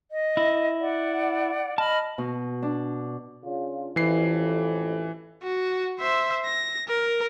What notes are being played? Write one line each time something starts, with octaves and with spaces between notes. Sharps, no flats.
D#5
E4
D5 F#5
D#5 A5 B5 F6
B2
D4
C#3 D4 F4
A1 F2 E3 C7
F#4
C5 E5
A#6
A#4